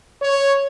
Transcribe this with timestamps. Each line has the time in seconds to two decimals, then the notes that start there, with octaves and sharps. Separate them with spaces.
0.22 C#5